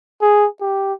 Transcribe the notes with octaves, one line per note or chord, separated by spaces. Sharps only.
G#4
G4